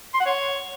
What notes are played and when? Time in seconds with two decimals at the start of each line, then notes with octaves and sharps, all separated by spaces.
0.14 C6
0.20 F#5
0.26 C#5